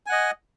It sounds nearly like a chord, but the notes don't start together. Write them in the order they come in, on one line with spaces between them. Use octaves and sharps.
G#5 F#5 D#5